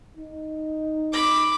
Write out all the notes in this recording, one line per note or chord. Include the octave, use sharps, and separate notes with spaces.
D#4
B5 D6